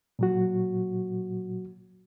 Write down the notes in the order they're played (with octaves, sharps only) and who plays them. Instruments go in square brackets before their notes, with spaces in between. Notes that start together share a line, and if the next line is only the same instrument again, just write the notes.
[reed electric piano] A#2 F#3 F#4